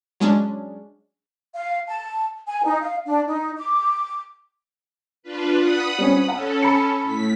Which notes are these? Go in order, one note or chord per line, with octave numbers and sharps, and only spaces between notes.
F#3 G#3 C#4 D4
F5
A5
G#5
D#4
F5
D4
D#4
D6
D4 F4 B4
F#5 B5 D#6
G3 C4 C#4
C#4 A4 F#5
B5 C#7
A2 B6